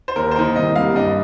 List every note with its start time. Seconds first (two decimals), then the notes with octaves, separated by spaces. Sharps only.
0.08 C5
0.16 D#2 A#4
0.31 C5
0.36 D#3 A#3 A#4
0.56 C2 D#5
0.76 C3 G3 A#3 F5
0.96 G2 D#5